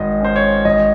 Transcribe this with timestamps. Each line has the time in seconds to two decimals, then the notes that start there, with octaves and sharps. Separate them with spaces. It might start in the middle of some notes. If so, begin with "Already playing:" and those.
Already playing: G#1 D#5
0.21 C#4 C5
0.36 C#5
0.65 G#1 D#5